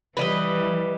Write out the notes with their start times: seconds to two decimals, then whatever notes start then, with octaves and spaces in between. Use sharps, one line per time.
0.17 E3 G3 B4 D5 D#5